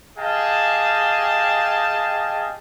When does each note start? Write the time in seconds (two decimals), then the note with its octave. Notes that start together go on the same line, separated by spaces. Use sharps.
0.18 G4 G#4 D#5 F5 G5 A5